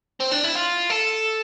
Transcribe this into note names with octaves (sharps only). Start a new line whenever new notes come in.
C4
D4
E4
F4
A4